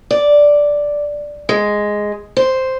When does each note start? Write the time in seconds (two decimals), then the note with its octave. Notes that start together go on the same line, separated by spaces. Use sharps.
0.11 D5
1.49 G#3
2.37 C5